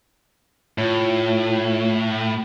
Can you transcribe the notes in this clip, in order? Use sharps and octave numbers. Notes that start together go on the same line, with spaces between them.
A2 F4 C#5